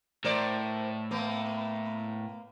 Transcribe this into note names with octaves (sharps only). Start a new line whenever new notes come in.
A2 A#4 C5 D5
A#3 B3